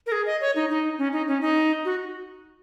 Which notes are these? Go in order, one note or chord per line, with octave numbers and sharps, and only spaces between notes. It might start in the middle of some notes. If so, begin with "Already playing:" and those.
A#4
G#4
D#5
C#5
D#4
D#4
C#4
D#4
C#4
D#4
F#4